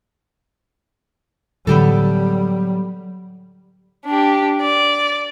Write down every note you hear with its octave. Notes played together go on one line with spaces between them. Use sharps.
A2 D3 E3 F#3 G3 B3 G4 A4
D4 G4
D5